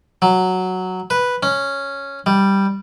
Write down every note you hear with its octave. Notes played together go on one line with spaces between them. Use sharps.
F#3
B4
C#4
G3